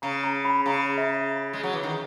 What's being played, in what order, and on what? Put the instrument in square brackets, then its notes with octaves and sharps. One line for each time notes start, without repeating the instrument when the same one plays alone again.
[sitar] C#3 [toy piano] A#5
[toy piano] A#5
B5
[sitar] C#3 [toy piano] A#5
[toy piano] E5
[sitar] G#3
F#3
E3
D#3